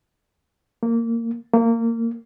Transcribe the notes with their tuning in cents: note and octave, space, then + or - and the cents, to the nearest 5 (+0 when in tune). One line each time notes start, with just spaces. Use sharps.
A#3 -15
A#3 -20